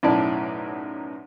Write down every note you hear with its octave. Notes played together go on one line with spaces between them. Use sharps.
B1 F#2 A2 E4 D5 A5